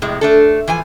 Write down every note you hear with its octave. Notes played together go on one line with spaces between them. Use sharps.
F2 A2 C3 G#3
A3 D4 A4
E3 F3 G#5